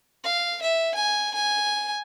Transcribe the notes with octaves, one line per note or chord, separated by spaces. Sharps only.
F5
E5
G#5
G#5